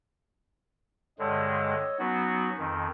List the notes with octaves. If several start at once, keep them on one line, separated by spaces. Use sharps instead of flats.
G2 D3 G#3 A4 C#5 D#5
F#3 B3 C#4 D#4 F#4 B4
F2 D#3